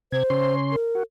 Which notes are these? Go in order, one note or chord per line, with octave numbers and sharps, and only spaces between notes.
C3 C5 G#6
C#3 C#4 C6
A#4
F#4